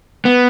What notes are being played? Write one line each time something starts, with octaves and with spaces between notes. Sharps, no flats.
B3